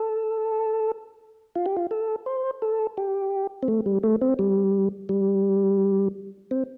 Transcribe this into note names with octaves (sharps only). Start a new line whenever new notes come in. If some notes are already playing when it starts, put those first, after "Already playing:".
Already playing: A4
F4
G4
F4
A4
C5
A4
G4
C4
A3
G3
A3
C4
G3
G3
C4